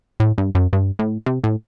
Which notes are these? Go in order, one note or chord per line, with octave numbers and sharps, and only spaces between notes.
A2
G2
F#2
G2
A2
C3
A2